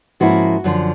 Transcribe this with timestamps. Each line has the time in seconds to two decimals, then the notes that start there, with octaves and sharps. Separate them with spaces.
0.20 G#2 F3 A#3 C#4 E4 F#4
0.64 F#2 D3 F3